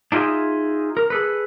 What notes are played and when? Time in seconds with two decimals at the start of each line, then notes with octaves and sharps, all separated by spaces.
0.12 D4 D#4 F4 G#4 E5
0.97 A#4
1.10 G#4 A4 B4